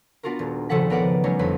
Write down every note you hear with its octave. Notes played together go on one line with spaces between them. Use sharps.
B3 D4 F4 F#4 A#4
D#1
G#1 C#3 F3 A4 F#5 B6
B3 A#4 B4 D5 F#5
F#3 G3 A3 C#4 D#4 G#4
G1 F2 F#3 B4